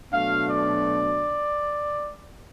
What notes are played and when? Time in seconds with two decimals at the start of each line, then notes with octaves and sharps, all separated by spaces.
0.11 B2 F#3 A3 D4 F5
0.48 D5